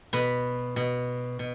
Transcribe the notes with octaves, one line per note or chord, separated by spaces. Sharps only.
B2 B4
B2
B2